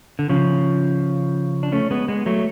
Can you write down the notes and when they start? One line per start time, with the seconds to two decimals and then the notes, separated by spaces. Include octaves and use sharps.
0.19 D3
0.29 C#3 F3
1.63 D4
1.72 A3 C#4
1.91 G#3 B3
2.08 G#3 B3
2.26 F#3 A3